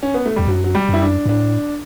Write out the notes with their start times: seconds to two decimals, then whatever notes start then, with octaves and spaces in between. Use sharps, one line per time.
0.03 C#4
0.14 B3
0.26 A3
0.36 E2 G3
0.47 F#2 F#3
0.64 F#3
0.75 G3
0.89 F#2 E4
1.02 D4
1.26 G2
1.29 A2 D4